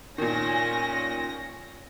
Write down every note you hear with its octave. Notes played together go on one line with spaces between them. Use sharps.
A#2 D#3 C#4 A#6